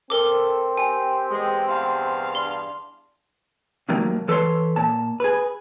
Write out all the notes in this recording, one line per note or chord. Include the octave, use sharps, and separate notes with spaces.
C4 A4 A#4 D6
G4 G#5
E2 G#3
E2 G2 F5
D4 C6
C3 D#3 F#3 A3 A#3
E3 A4 B4 C#5 D#5 C6
A#2 A5
G#4 B4